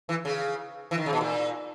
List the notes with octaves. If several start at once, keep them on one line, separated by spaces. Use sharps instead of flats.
E3
C#3
E3
D#3
C#3
B2
A#2